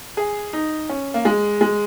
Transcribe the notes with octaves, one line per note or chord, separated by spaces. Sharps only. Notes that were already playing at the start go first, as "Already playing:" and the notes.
G#4
D#4
C#4
A#3
G#3
G#3